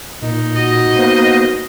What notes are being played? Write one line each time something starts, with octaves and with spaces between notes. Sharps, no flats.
A#2 D#4
F#4 D#5
A#3 B3 C5